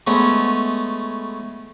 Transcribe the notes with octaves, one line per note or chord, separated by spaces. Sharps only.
G#3 A3 B3 C#4